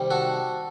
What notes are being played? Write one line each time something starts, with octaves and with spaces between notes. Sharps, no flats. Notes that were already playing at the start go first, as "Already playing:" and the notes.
Already playing: C3 D#3 G3 C4
F#4 A4